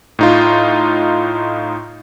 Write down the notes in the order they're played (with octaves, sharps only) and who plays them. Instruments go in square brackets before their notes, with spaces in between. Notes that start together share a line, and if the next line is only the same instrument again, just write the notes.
[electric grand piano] A2 D#4 F4